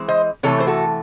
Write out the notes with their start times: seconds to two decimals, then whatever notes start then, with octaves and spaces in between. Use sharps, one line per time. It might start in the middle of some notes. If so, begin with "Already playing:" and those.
Already playing: E3 G#3 C4
0.08 C5 D#5
0.43 C3 E3 A3 A4 C#5
0.60 C5
0.67 F#4 A4